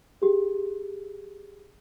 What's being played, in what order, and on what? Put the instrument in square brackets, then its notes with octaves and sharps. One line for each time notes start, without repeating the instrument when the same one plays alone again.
[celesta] G4 G#4